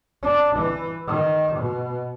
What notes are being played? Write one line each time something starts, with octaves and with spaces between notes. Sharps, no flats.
D4
E3
D#3
B2